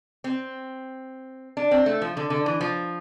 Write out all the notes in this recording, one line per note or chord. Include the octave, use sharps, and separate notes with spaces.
C4
D4
C4
A3
F3
D3
D3
E3
F3